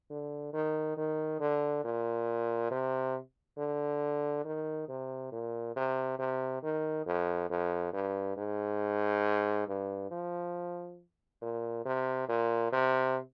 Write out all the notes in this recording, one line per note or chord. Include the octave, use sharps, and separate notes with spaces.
D3
D#3
D#3
D3
A#2
C3
D3
D#3
C3
A#2
C3
C3
D#3
F2
F2
G2
G#2
G2
F3
A#2
C3
A#2
C3